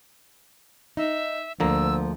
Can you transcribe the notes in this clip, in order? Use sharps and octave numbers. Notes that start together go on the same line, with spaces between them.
D#4 E5
D2 D3 F3 A#3 A#5 E6